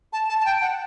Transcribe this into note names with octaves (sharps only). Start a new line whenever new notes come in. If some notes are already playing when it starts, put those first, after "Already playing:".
A5
A5
A5
G5
F#5